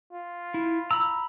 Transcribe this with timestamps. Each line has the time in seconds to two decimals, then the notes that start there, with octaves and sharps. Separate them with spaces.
0.13 F4
0.54 E4
0.91 A#5 B5 E6